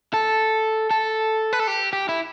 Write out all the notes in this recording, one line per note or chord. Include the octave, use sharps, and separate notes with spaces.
A4
A4
B4
A4
G4
G4
E4